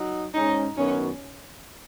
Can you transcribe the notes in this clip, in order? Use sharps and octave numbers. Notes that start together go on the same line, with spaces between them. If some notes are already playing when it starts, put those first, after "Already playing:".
Already playing: F#3 D#4
G#2 G#3 C#4 D#4
F#2 D#3 B3 C#4 F#4 C#5